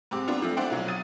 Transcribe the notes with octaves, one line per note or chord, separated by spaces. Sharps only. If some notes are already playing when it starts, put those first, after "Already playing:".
G#2 C4 G4 D6
B3 D4 F4
F3 A3 C4
D4 C5 D5 E5 F#5 G5
C2 B2 F#3
D#6 E6 A6 D#7